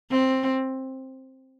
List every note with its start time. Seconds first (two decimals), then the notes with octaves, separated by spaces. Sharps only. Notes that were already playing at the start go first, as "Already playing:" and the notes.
0.11 C4